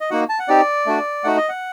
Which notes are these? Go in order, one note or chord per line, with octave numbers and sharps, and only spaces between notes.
D#5
A#3 D#4 F#4 F#5
A5
F#5
C4 D#4 G4 D5
A3 D4 F#4
A3 D#4 F#4 F#5
D#5
F#5